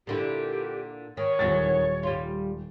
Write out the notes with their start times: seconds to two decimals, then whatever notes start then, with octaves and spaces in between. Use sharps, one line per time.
0.07 A#2 D3 E4 G4
1.17 D#3 C#5
1.39 D#1 E2 D#3 F#3 A6
2.03 G3 F4